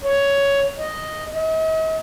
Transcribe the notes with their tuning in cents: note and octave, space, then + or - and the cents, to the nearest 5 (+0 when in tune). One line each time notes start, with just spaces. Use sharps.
C#5 +10
D#5 +0
D#5 +45